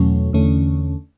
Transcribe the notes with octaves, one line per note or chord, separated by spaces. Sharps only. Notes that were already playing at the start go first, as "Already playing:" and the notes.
Already playing: E2 B2 F#3 A3 C#4
E2 D3 A3 C#4